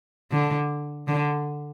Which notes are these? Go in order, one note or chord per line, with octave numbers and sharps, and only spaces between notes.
D3
D3